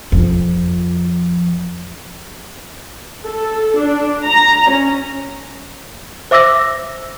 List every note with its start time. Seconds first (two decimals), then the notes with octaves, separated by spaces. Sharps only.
0.12 F2 F3
3.25 A4
3.77 D4
4.25 A#5
4.69 C#4
6.31 C5 E5 D6 E6 A#6